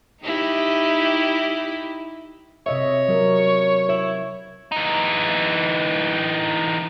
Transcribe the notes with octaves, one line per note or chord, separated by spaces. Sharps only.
D#4 E4 G4
C3 C#5 D#5 E5
F#3 A#4
E4 C#5
E3 D#4